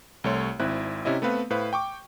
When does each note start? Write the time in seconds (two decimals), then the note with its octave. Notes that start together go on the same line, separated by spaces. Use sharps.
0.24 C2 A3 C#5 C6
0.60 G#1 C4 E4 F#6
1.05 C3 C#4 E4 D#5
1.22 A3 B3 C4 B4 F5
1.50 A2 B4 C5 F5
1.73 G5 C#6 D6